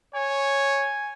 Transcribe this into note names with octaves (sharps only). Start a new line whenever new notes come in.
C#5 G#5